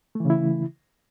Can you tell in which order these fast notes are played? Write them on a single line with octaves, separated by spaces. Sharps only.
A3 E3 C#3 E4